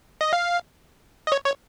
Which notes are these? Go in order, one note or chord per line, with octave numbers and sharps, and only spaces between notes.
D#5
F5
D#5
C#5
C#5